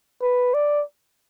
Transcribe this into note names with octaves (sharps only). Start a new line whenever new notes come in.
B4
D5